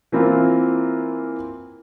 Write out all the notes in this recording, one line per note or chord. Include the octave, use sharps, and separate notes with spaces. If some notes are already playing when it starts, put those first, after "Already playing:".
E3 A#3 C4 E4 F4